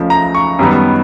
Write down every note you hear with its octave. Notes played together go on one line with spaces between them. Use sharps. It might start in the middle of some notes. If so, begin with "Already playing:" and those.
Already playing: C#2 C#3 F3 A3
A#5
C#6
F#2 D#3 G3 B3